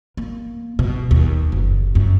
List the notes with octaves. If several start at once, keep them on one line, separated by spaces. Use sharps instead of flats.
A#3
B2
D#2
F#1
F#2